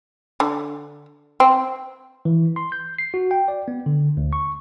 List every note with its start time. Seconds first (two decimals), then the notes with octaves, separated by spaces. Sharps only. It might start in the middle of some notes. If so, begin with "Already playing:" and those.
0.40 D3
1.40 C4
2.25 E3
2.56 C6
2.72 G6
2.98 C7
3.14 F#4
3.31 G5
3.48 D5
3.68 B3
3.86 D3
4.17 D2
4.33 C#6